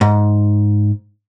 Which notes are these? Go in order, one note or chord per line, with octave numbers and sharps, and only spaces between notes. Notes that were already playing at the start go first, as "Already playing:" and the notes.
G#2